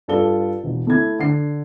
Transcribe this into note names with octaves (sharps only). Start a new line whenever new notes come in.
G2 F4 A4 D5 G7
E1
A3 E4 G#6
D3 C7